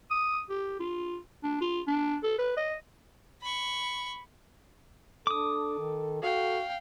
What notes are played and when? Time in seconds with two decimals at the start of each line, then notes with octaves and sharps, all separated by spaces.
0.11 D#6
0.50 G4
0.80 F4
1.43 D4
1.61 F4
1.87 D4
2.23 A4
2.38 B4
2.57 D#5
3.42 B5 C#6
5.27 D4 A4 D6 D#6
5.78 D#3
6.22 F#4 A4 F5 G5